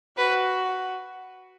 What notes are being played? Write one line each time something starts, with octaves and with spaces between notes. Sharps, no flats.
F#4 B4